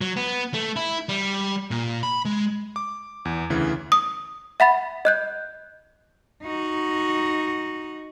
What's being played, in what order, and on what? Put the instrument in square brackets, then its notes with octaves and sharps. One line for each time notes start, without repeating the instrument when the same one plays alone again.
[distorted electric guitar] F#3
B3
A3
E4
G3
A#2
B5
G#3
[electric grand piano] D6
E2
D2 C#3 E3
[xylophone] D#6
E5 F#5 B5 A6
D#5 F#6 G6
[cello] D#4 F#4